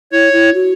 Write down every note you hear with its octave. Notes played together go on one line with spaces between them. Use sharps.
E4 C#5
E4
F#4